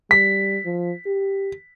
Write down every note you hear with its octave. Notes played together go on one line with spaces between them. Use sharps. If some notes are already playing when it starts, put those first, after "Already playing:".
G3 B6
F3
G4